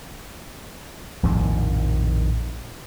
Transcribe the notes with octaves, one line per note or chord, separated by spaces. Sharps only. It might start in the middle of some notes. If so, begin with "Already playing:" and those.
A#1 F2 A2 D#3